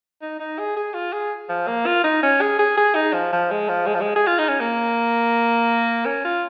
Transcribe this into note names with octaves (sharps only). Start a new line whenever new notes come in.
D#4
D#4
G#4
G#4
F4
G#4
F3
A#3
F4
D#4
C#4
G#4
G#4
G#4
D#4
F3
F3
G#3
F3
G#3
F3
G#3
G#4
F4
D#4
C#4
A#3
C#4
F4